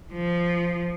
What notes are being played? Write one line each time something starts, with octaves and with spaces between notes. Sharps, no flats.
F3